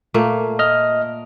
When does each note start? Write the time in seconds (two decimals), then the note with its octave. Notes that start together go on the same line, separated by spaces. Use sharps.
0.14 A#2 A3 A#3
0.59 D#5 F6